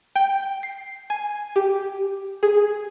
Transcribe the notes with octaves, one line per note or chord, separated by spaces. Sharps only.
G5
C7
G#5
G4
G#4